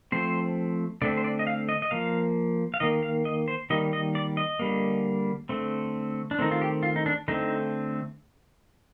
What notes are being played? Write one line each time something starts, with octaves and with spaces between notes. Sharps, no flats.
F3 A3 C4 C5
D3 A3 C4 D5
C5
D5
D#5
F5
D#5
D#5
F3 A#3 F5
F5
D#3 A#3 D#5
F5
D#5
C5
D#3 G3 A#3 D#5
D#5
D5
D#5
D3 G3 A#3
D3 A3 C4
D4
D#3 A3 C4 D#4
F4
G4
F4
D#4
D4
D3 A3 C4 D#4